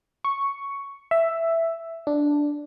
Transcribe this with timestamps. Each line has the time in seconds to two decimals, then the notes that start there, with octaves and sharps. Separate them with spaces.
0.25 C#6
1.11 E5
2.07 D4